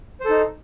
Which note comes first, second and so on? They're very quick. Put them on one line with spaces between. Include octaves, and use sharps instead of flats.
C5 A4 D#4